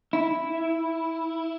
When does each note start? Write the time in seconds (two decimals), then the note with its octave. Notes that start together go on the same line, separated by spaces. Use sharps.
0.13 E4